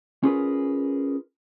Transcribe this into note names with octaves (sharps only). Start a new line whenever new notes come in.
C#4 F4 G#4 A#4 B4